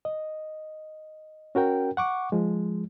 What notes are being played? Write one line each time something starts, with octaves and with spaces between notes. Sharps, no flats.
D#5
C#4 F#4 A#4 G5
F#5 C#6 D6
F3 G#3